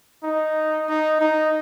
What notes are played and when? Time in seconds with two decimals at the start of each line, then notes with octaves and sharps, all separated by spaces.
0.24 D#4
0.89 D#4
1.21 D#4